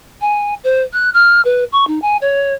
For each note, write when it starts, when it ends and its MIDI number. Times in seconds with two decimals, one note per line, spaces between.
0.21 0.54 80
0.64 0.82 72
0.93 1.10 90
1.14 1.41 89
1.45 1.64 71
1.72 1.87 85
1.87 1.99 63
2.02 2.17 80
2.21 2.54 73